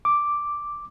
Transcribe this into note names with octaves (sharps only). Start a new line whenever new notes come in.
D6